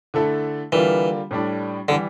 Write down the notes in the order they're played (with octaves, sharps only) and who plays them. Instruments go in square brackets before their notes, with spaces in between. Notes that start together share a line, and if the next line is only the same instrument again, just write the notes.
[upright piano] D3 A3 E4 A4
[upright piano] D3 G3 A#3 F4 [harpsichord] E3
[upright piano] A2 G3 D4
[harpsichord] D3 [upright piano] E3 G3